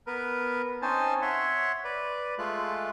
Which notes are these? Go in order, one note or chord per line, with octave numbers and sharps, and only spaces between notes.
B3 A#4 B4
C4 C#4 D#4 C5 G#5 A5
C#5 E5 F#5 C6
B4 D5
G#3 A3 F4 F#6